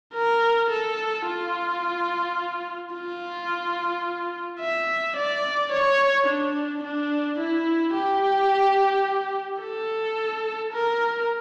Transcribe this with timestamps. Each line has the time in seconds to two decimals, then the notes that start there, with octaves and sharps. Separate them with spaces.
0.15 A#4
0.71 A4
1.26 F4
2.93 F4
4.61 E5
5.16 D5
5.72 C#5
6.27 D4
6.83 D4
7.39 E4
7.95 G4
9.62 A4
10.73 A#4